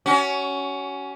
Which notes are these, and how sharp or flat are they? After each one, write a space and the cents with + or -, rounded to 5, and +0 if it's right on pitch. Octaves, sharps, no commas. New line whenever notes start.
C#4 +15 F#4 +30